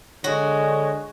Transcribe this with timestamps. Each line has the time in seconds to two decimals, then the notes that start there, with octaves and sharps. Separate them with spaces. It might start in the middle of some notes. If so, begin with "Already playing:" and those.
0.24 D3 G#3 F#4 C#5